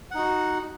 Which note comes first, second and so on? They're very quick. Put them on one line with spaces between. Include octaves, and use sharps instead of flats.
F#5 D#4 F#4